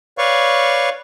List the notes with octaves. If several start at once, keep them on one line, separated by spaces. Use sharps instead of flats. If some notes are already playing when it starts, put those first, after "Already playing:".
B4 C#5 D5 F5 C#6